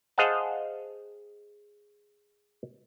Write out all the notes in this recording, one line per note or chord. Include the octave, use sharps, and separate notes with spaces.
G#4 C5 D#5 F5 F#5 A5